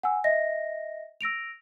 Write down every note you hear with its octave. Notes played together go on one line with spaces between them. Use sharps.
F#5 G#5 E6
D#5 E5 A#6
E6 A#6 D7 F7